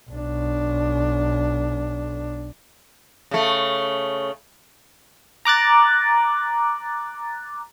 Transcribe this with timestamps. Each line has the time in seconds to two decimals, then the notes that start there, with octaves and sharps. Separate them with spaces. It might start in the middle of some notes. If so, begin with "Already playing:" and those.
0.10 B1 D4
3.31 C#3 A3
5.45 A#5 D6 F#6 A6